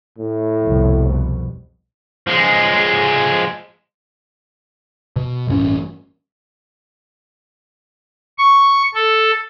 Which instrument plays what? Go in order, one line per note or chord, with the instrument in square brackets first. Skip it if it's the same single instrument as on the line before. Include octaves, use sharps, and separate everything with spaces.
[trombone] A2
[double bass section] C2 F2 B2
[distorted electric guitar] F3 G#3
[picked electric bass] B2
A1 G2 C#4
[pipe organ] C#6
A4